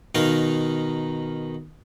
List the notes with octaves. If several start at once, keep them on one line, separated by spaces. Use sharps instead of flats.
B2 D#3 D#4 A#4 F5